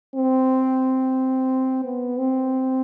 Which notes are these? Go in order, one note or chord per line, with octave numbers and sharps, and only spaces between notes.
C4
B3
C4